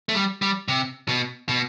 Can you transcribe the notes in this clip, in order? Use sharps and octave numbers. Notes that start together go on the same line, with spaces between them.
A3
G3
G3
C3
B2
B2